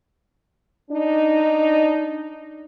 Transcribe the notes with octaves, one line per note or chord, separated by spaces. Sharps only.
D4 D#4